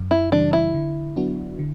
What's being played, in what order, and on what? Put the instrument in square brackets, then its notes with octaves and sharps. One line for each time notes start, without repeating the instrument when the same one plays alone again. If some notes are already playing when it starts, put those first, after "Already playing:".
Already playing: [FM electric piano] F#2
[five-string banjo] E4
[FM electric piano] C#3 E3 G3 [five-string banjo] D4
[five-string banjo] E4
[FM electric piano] D3
F#3 B3 D4 F#4
D3